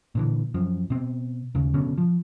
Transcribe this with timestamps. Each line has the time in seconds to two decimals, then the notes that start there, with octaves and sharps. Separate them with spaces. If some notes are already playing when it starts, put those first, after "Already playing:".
0.15 A#2 D3 E3
0.54 F#2 F3
0.90 B2 C4
1.55 D#2 C#3
1.74 F#1 B2 D3 C#4
1.98 F3